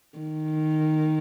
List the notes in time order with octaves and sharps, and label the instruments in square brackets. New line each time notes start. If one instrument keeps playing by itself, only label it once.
[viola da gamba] D#3